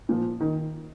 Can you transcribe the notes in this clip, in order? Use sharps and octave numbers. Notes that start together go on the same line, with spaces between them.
A#2 F3
D#3